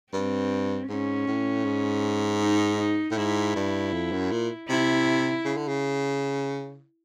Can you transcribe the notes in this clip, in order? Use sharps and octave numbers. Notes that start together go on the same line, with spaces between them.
G2 C4
G#2 C#4
A2
G#2
D#4
D#4
A2
G#2 E4
G2
F2
F#2
A#2
C3 E4
C#3
D3
C#3